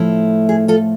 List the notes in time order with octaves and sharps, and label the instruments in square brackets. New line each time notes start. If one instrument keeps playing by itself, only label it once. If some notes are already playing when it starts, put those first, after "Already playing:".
Already playing: [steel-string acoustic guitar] A2 F3 A3 E4
G#4
F4 A4